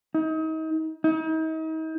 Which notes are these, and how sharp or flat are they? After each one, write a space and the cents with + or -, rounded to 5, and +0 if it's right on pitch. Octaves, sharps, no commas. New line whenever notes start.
D#4 +35
D#4 +40